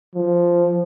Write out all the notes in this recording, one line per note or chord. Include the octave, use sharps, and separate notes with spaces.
F3